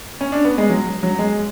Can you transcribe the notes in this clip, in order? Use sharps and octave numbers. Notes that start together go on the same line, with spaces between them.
C#4
D4
B3
G#3
F#3
F#3
G#3